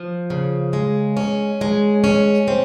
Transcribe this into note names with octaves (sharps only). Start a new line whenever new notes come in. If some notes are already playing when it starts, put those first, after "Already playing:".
Already playing: F3
C#3
G#3
C#4
G#3
C#4
C4